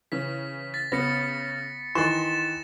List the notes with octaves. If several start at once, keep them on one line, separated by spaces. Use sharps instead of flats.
C#3 E3 B6
A6 B6
C#3 B3 A#6 C#7
D#3 E3 C6 A6 E7